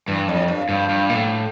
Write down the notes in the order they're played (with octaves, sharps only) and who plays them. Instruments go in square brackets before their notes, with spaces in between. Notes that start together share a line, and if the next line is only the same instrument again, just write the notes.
[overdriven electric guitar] G2 [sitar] E3
[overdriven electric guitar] F2 [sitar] A2
[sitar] G2
[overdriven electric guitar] G2 [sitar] F3
[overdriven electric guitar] G2
A#2
A2